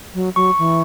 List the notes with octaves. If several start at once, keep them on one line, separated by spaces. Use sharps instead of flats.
F#3
F#3 C#6
E3